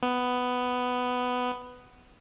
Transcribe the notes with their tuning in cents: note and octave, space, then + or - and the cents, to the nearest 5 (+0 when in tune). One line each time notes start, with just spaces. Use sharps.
B3 +10